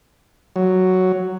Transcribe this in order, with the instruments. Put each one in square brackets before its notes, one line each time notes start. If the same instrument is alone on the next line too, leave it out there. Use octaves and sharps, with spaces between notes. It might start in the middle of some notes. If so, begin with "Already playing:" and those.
[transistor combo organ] F#3